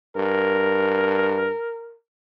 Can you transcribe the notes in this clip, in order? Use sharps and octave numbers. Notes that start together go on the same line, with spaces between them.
G2 A#4